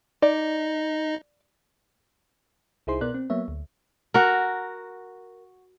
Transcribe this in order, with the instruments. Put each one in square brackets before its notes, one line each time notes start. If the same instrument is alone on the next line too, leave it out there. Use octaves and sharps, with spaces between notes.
[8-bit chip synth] D#4 D#5 [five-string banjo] D5
[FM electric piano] C2 D#4 E4 G#4 C5 C6
B2 B3 A#4 D5 F#6
C4
F#3 A#3 B3 C#5 E5
D2
[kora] F#4 A#4